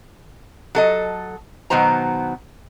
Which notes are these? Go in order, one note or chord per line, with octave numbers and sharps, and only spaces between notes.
F#3 A4 D#5
B2 D#3 F#3 B3 C5 A#5